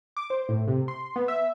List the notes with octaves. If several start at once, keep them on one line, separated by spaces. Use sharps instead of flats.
D6
C5
A2
C3
C6
B3
E5